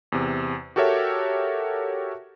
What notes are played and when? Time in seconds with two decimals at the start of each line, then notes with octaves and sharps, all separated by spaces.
0.12 E2 C3
0.76 F#4 G4 A4 A#4 C#5 E5